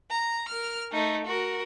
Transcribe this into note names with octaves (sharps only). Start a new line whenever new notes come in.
A#5
A#4 F6
A3 D#4
F#4 A#4